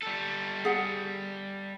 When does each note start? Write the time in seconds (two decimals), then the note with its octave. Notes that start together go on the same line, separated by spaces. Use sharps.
0.02 G3 A4
0.65 G#4 F#5